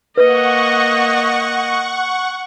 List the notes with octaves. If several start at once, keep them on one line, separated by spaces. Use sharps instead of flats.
A#3 B4 D#5 F#5 C#6